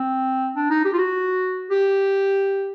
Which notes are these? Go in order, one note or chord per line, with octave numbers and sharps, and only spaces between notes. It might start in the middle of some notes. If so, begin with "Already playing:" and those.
Already playing: C4
D4
D#4
G4
F4
F#4
G4